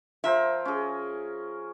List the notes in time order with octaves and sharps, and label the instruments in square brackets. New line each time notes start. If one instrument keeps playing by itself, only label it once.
[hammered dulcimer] F3 A#4 C5 [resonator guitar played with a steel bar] E5
[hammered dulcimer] C#4 G#4